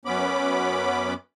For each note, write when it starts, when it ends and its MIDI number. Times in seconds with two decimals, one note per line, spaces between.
0.05 1.14 42
0.05 1.14 59
0.05 1.14 61
0.05 1.14 83
0.05 1.14 86